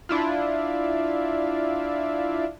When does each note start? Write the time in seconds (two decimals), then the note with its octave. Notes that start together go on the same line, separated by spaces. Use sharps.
0.09 D4 E4 F4